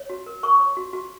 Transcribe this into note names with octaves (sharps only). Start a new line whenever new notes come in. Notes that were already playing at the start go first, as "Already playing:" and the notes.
Already playing: C#5
F#4
A#4
A#4 C#6
C#5
F#4
F#4